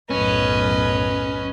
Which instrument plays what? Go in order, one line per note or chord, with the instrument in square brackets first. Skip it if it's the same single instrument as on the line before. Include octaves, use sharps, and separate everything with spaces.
[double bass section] B1 [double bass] F#2 A2 [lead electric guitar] C#4 [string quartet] B4 D#5